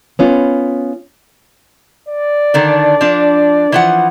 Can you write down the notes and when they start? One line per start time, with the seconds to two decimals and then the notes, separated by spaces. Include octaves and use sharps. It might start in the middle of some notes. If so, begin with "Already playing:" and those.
0.19 B3 C#4 F4
2.08 D5
2.54 D3 D#3 D4
3.01 F3 D4
3.72 E3 F3 F#5